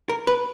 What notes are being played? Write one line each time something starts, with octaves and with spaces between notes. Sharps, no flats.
A#4
B4